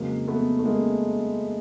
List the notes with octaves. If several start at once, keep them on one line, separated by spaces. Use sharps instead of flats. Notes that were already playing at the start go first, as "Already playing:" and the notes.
Already playing: F2 C#3 F#3 G#3 A#3
A3 B3
A3
G#3 A#3